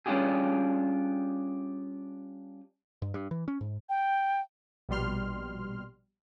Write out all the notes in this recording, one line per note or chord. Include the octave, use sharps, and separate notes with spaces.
G3 C#4 D4 F4 G4 G#4
G2
G2
E3
C#4
G#2
G5
A#1 B2 G3 C6 F6